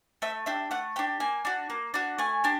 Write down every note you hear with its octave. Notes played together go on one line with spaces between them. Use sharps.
A3 E5
D4 G4 E5
A3 F#5
D4 G4 G5
A#3 G#5
D4 F#4
A#3
D4 F#4
A3 G#5
D4 G4